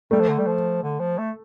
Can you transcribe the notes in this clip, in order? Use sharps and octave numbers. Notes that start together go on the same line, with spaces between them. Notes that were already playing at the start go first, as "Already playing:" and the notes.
G3 A3
F3
D3
G3
F3
D3
F3
A3